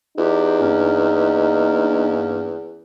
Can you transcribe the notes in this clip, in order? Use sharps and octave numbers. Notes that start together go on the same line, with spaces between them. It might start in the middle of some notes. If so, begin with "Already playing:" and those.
E2 D#4 F4 G4
G2 A#3 C#4